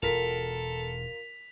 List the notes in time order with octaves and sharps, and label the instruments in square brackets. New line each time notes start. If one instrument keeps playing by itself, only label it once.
[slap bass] E1 [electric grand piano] F4 A#4 [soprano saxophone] A4 [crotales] B6 F7